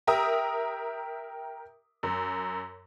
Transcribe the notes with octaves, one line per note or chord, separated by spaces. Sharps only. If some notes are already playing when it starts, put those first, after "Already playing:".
G4 A#4 E5 A#5 D#6
F#2